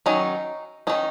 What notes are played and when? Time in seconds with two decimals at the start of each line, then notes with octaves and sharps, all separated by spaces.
0.06 D#3 F#3 C#4 D#4
0.87 D#3 F#3 C#4 D#4